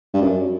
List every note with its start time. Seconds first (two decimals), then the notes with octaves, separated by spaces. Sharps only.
0.14 G2
0.22 F#2